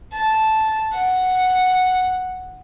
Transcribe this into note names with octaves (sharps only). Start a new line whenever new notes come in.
A5
F#5